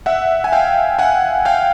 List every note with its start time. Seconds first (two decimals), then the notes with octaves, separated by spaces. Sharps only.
0.06 E5 F#5
0.44 G#5
0.52 F5 G5
0.99 F#5 G#5
1.45 F5 G5